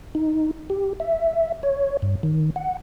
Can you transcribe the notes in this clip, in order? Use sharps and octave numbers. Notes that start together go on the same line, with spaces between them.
D#4
G4
E5
C#5
G2
D#3
F#5